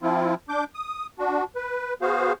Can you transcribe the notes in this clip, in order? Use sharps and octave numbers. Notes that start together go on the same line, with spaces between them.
F3 C4 E4 F4
D4 D6 G6
D#6
D4 F#4
B4
B3 F#4 G#4 C5 F5